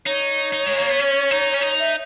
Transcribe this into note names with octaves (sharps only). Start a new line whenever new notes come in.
D#4 C#5
D#4
G#3
A#3
B3
C#4
D#4
C#4
D#4
E5